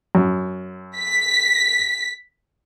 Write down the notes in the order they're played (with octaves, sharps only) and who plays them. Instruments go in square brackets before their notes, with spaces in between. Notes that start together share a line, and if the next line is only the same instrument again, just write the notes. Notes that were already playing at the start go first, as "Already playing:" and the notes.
[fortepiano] F#2
[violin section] B6